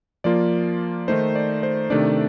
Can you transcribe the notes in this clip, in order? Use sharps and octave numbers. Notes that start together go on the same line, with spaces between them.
F3 A#3 F4 D5
D#3 A3 D#4 C5
D5
C5
C3 D#3 A3 D4 D5